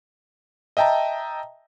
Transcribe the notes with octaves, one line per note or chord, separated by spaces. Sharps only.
D#5 E5 G5 A5 A#5